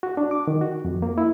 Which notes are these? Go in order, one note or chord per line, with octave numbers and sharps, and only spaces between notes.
F#4
D4
D6
D#3
F#4
F2
A#3
E4